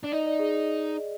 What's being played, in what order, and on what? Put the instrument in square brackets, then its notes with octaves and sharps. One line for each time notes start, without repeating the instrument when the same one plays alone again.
[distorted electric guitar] D4 [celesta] D5
[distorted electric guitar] D#4 [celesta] D#5
[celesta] D5
G#4